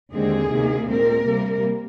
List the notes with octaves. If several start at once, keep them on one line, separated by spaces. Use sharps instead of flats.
D#2 D3 G#3 C4 G#4
D2 C3 D#3 A#3
A#2 G#3 C4 A#4
C3 G3 A#3